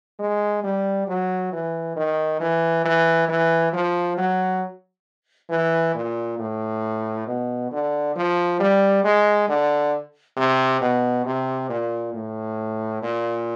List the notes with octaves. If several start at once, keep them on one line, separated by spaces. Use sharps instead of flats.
G#3
G3
F#3
E3
D#3
E3
E3
E3
F3
F#3
E3
A#2
A2
B2
D3
F3
G3
G#3
D3
C3
B2
C3
A#2
A2
A#2